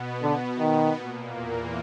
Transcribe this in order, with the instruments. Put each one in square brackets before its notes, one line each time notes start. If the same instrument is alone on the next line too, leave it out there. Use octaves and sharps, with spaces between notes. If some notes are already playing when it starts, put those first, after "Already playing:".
Already playing: [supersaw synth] B2 B3
[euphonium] D3
D#3
[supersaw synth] A#2 A#3
E2 E3